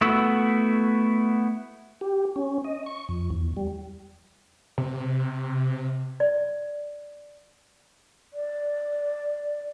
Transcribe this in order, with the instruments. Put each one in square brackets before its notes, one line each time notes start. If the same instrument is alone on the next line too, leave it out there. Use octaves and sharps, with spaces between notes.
[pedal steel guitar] A3 B3 E4 F#4 E6
[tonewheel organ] G4
C#4
D#5
C#6
F2
E2
G3
[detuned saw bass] C3
[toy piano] D5
[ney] D5